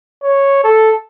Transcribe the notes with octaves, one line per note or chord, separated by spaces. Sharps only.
C#5
A4